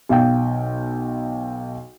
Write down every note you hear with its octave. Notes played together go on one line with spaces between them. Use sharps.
B1 F5 G5